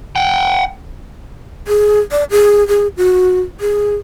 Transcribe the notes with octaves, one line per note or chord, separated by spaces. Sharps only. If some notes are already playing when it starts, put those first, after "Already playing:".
F#5 G5
G#4
D5
G#4
G#4
F#4
G#4